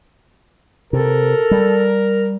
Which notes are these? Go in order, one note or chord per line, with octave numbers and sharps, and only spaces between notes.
C3 A4 A#4
G3